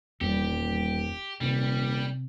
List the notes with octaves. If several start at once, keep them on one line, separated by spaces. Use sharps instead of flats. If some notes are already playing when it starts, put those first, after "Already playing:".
D#1 E2 G3 G4
D#1 C3 G3